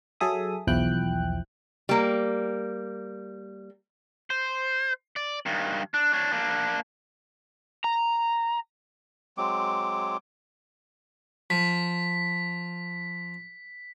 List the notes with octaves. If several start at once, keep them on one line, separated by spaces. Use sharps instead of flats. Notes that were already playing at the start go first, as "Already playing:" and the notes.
F#3 G#4 A4 E5 D#6
B1 E2 F3 E4 G5 F#6
G3 A#3
C5
D5
G2 D#3
D4
D4 C#5
A#3 D4
A#5
F#3 G#3 C4 D6
F3 B6